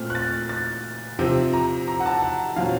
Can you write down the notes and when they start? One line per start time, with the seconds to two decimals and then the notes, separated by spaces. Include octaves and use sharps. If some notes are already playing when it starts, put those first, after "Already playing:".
Already playing: A#2 A3 C4 F6
0.10 F#6
0.15 A6
0.49 A6
1.19 C3 F3 C4
1.53 A#5
1.87 A#5
2.00 F#5
2.06 A5
2.23 F#5
2.56 A#2 F#3 C4 F5